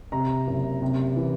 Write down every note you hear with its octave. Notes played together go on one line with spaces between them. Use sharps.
C3 A#5
F#1
C3
E3